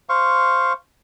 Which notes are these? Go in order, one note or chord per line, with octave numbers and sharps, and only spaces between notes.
C5 F5 C#6